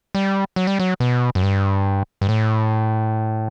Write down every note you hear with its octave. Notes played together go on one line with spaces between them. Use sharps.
G3
F#3
G3
F#3
B2
F#2
G2
G2
A2